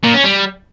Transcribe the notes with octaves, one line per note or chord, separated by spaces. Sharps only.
A#2
C#4
G3